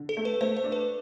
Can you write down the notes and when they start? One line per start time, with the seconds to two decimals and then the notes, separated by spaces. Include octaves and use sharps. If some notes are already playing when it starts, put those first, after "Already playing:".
Already playing: D3
0.09 A4
0.17 A3
0.25 B4
0.41 A3 C5
0.57 C5
0.64 D4
0.72 B4